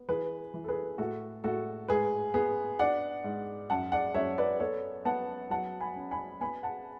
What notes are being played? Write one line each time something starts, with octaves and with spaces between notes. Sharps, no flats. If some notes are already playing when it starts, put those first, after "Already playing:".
Already playing: B3
E3 G#4 B4
E3
A4
G#4 B4
A2 F#4 A4
A2 F#4 A4
G#2 G#4 B4
B3 G#4
D4 D5 F#5
G#2
F#2 F#5 A5
D5 F#5
F#2 C#5 E5
B4 D5
B3 A4 C#5
B3 F#5 A5
F#3 F#5 A5
G#5 B5
C#4
G#5 B5
B3 G#5 B5
F#5 A5